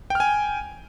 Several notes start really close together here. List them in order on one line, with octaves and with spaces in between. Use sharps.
G5 F6 G#5